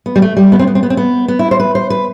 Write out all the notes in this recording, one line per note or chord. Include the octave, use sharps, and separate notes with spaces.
B3
G3
A3
G3
B3
C4
B3
C4
B3
C4
B3
B3
E4
C5
B4
C5
B4